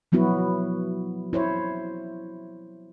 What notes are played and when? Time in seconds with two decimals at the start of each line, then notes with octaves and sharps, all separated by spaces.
0.12 F3 F#3 B3 E4 F#4
1.33 E4 C5 C#5